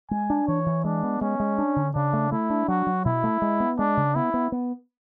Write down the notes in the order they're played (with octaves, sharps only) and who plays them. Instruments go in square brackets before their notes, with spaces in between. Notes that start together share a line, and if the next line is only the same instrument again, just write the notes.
[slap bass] G#3 [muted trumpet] G#5
[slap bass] D4
[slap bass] E3 [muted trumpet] C#5
[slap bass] E3
[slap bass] G#3 [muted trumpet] D4
[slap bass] B3
[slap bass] G#3 [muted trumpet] C#4
[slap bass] G#3
D4
D3
[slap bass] C#3 [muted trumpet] D4
[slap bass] A3
[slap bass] A3 [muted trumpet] E4
[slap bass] D4
[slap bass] F#3 [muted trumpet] F#4
[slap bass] F#3
[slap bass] B2 [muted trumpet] E4
[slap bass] A3
G#3
B3
[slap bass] G#3 [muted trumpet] D4
[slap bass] C#3
[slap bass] B3 [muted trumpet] E4
[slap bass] B3
B3